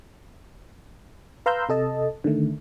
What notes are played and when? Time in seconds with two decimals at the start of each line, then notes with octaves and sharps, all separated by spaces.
1.46 B4 F5 A#5 C6 E6 G6
1.69 C3 A4 D#5 A5
2.24 D3 D#3 A3